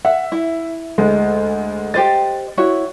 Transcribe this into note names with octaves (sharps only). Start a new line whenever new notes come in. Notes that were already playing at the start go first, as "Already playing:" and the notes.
E5 F#5
E4
D2 G#3
G4 C5 D#5 A6
E4 F#4 C#5